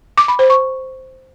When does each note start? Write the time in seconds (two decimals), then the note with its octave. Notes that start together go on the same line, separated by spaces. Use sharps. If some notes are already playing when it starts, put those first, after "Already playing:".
0.18 D6
0.28 B5
0.39 C5
0.50 C#6